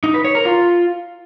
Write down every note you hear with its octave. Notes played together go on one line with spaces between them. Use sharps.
D#4
B4
C#5
A#4
F4